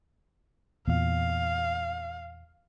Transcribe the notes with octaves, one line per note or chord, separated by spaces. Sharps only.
E2 A#2 F5